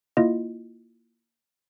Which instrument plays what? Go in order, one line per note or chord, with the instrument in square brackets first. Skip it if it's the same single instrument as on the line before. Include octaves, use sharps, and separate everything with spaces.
[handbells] A#3 E4 F4 D#5